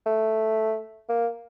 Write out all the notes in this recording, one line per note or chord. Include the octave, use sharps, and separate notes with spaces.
A3
A#3